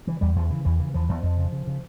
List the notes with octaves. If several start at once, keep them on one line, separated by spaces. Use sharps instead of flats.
C#3 E3
E2 G3
E2 F3
C#3 E3
E2 E3
C#3 E3
E2 F3
E2 F3
F2
C#3
C#3
C#3